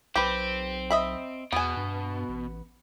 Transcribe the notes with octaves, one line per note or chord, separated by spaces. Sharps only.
B1 C4 G4 B4
D#5 E5 B5
E2 B2 B3 G#5
G2
A1